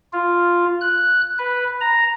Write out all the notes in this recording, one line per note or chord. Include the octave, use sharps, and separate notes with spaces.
F4
F#6
B4
A#5